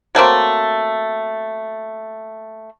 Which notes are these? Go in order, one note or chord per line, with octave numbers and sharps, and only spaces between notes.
F#3 A3 A#3 C4